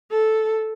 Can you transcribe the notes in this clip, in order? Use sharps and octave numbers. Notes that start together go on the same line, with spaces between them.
A4